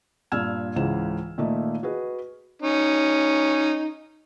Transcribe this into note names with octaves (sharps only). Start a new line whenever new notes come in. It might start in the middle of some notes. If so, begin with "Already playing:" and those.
G2 A#2 E6 F6 G#6 E7
C#2 G#2 C#3 E3 E7
A#2 D#3 A3 A#3 D#5 E5
F#4 G#4 B4 D#5
C#4 D#4